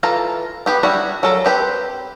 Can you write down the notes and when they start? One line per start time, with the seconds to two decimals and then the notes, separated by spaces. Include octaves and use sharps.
0.03 E3 F4 A4 A5 A#5
0.66 B3 G4 B4
0.83 G3 D4 E4 F#4
1.23 F#3 A4 A#4
1.45 C4 G4 B4 C5